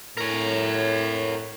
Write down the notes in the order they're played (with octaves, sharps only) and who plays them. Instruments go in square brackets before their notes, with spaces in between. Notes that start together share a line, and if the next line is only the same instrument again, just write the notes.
[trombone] A2 [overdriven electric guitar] A#4 C#5